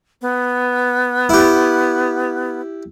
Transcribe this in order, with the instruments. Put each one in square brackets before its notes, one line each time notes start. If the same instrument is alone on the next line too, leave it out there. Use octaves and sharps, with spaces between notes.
[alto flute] B3
[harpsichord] E4 G4